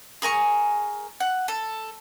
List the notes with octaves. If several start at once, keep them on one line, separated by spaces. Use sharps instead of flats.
G#4 A#4 G#5 C#6
F#5
A4